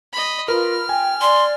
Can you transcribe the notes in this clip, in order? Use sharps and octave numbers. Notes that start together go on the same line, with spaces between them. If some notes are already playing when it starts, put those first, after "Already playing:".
D#5 B5
F4 A#4 B4 B5 F6
G5 G#5
D5 C6